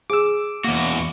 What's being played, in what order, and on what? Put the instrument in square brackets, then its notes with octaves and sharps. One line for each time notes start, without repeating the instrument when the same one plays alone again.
[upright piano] G#4 [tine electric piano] D6 E6
[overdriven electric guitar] E2 F#4 [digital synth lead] A#3